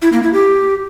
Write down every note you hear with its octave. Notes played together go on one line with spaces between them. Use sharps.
E4
A#3
E4
G4